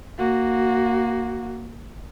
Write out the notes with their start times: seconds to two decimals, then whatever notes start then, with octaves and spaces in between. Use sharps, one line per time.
0.18 A#3 F#4